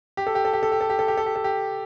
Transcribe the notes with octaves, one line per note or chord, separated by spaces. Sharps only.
G4
A4
G4
A4
G4
A4
G4
A4
G4
A4
G4
A4
G4
A4
G4